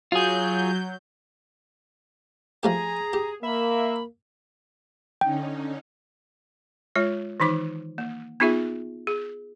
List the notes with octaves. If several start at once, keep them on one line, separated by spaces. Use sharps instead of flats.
F#3 F4 G#4 G6
F3 A3 G4 G#4 A#5
G4
A#3 E5 B5
D3 C#4 D#4 G5
G#3 F4 C#5
D#3 E3 D#4 D6
A#3
B3 D#4 F4 G#4 E5
G#4